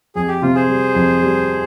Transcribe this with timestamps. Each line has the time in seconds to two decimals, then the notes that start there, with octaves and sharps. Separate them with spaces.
0.15 F2 G#4
0.28 G4
0.42 C3 F4
0.55 G#4 C5
0.69 G3
0.95 F2
1.22 G3